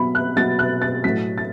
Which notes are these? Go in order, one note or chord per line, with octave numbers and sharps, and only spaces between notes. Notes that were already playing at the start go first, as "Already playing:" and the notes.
Already playing: B2 F#3 B5
F#6
B2 F#3 A6
F#6
A6
A2 F#3 B6
A6